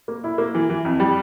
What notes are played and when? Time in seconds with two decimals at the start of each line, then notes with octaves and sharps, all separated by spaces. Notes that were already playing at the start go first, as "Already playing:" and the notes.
0.08 A#3
0.24 E4
0.38 A#3
0.55 E3
0.70 E3
0.85 F2
1.00 G3